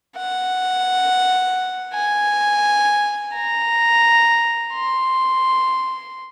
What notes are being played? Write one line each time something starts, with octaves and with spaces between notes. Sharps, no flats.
F#5
G#5
A#5
C6